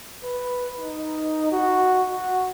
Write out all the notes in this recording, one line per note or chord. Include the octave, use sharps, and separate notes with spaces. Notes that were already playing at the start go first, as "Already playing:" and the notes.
B4
D#4
F#4
F#4